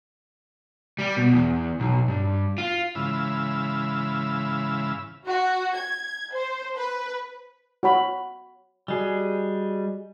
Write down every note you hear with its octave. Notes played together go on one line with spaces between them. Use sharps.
G3
B2
E2
B1
G2
F4
G#2 C#3 E3 F5 B5 E6
F#4
G#6
C5
B4
F#4 C#5 B5
G3 F#4 G#4 D#5